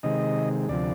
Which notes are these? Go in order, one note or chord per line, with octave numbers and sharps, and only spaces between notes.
C3 D#3 G#3 D#5
D2 C3 F3 D5